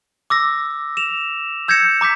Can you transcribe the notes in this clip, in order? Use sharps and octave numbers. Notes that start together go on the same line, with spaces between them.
D6 E6 A#6
E7 F7
E6 G6 G#6 A#6 C#7 E7
A#5 D6 G6 B6